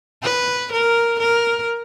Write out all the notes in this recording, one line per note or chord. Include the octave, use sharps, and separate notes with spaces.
B4
A#4
A#4